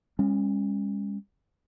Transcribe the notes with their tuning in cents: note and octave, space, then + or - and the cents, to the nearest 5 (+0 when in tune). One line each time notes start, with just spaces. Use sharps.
G#3 -45 C#4 -15